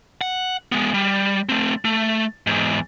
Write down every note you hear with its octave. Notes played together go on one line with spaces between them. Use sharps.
F#5
G#3 B3
G3
A3 C4
A3
E2 G#2